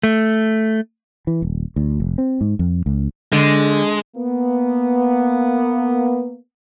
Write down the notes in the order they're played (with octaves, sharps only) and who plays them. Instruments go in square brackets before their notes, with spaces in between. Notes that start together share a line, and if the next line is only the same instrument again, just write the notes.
[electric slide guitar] A3
[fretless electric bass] E3
D#1
D2
F1
C4
G#2
F2
C#2
[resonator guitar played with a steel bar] D3 [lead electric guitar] G#3
[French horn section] A#3 B3